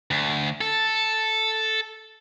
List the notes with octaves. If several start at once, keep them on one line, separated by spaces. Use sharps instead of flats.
D2
A4